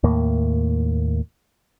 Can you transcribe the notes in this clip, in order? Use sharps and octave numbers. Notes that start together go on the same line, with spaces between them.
D#2 A2 A#3